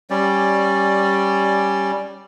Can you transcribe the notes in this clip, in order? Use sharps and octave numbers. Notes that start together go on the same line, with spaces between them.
G3 C#4 D5